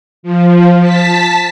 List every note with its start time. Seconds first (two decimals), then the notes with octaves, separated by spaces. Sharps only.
0.23 F3
0.79 A5 B6